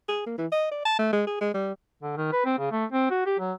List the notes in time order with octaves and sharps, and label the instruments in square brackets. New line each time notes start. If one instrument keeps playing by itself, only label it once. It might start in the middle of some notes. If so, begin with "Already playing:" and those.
[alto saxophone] G#4
A#3
E3
D#5
D5
A5
A3
G#3
G#4
G#3
G3
[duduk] D3
D#3
B4
C4
C#3
A3
C4
F#4
G4
F#3